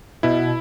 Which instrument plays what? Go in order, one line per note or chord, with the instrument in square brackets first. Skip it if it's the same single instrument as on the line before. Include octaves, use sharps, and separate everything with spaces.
[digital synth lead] B2 [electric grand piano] E4